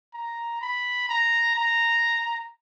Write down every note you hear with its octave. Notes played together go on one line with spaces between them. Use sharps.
A#5
B5
A#5
A#5